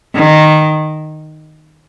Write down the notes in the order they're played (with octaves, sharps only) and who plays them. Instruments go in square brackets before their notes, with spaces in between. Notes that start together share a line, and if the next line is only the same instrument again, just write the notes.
[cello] D#3